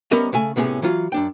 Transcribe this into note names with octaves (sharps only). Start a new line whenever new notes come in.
G3 B3 C#4 A#4 D#5 E5
C#3 A3 G#5
A2 C3 B3 C#4 G#4
E3 F#3 F4
F#2 D4 G5